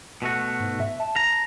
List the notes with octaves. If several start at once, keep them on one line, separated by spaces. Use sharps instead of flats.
B2 A3 F#4
G#2
E5
A5
A#5